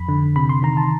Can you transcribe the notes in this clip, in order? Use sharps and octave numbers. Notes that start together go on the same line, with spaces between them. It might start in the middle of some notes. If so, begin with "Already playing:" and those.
Already playing: F2 B5
D3
C3 B5
C6
D#3 A#5
A5